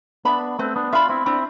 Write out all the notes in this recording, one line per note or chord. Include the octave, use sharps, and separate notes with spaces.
B3 D4 E5 B5
A3 C4 B4
B3 D4
D4 F4 E5 B5
C4 E4
C4 D4 E4